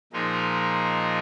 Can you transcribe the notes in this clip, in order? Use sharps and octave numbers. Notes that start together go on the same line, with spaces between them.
A#2 F3 G#3 D#4 A#4